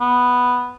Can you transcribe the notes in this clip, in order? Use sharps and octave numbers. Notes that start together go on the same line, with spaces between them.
B3